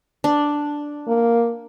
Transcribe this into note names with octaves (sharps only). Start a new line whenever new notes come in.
D4
A#3